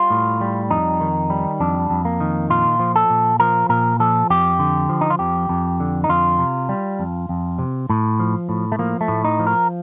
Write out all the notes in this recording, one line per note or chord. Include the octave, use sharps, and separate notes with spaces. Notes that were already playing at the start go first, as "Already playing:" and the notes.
Already playing: G3 F4
A2
G3
F2 D#4
D#3
G3
F2 D4
F2
A#3
D#3
A#2 F4
F3
A4
A#2
F3 A#4
A#2 A#4
F3 A4
F2 G4
D3
F3
D#4
F4
F2 G4
F2
D3
D#4
F2 F4
C3
G3
F2
F2
C3
A2
F3
A2
A3
F3 A#3
A3
A2
D#4
F3
A#4